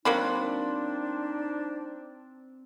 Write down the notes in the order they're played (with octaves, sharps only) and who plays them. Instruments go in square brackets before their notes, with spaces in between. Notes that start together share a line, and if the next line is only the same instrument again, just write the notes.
[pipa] F#3 A#3 B5 [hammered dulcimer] C4 [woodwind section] D4 D#4